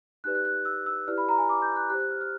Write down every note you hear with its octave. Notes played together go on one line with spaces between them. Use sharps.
D#4 G4 B4 D5 F#6
F#6
F#6
E6
E6
E4 G4 B4 D5 F6
B5
A#5
G#5
D6
G6
F#6
G4 C5 F#6
F#6
F6
F6